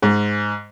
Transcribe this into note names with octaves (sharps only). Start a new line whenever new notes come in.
G#2